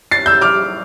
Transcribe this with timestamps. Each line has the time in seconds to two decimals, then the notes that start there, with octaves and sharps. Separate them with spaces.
0.11 A6 C7
0.26 E6 G6
0.41 D6 F6